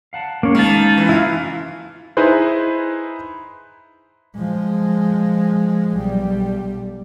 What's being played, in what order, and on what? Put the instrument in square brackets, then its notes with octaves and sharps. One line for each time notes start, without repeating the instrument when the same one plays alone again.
[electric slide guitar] F5 F#5 A5
[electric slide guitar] G#3 C#4 [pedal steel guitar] A#3 C#5
[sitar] D#3 [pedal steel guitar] F5 A5
[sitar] E3
[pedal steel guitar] E4 F4 F5
[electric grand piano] D#4 E4 G#4 B4 C5
[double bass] F3 G#3
B1 G3